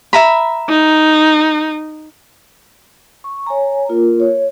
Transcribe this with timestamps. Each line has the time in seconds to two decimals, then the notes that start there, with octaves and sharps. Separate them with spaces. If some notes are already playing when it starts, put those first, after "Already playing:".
0.13 E5 A#5 B5
0.69 D#4
3.24 C#6
3.46 C#5 G#5 A#5
3.89 A#3 F4 A#4
4.20 C#5